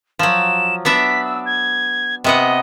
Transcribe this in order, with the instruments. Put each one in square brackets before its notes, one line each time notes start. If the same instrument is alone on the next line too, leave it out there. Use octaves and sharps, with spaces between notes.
[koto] F3 F#3 [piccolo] E7
[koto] B3 D4 E5 [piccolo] B6
[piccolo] E6
G#6
[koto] C3 B3 F#5 [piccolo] D#5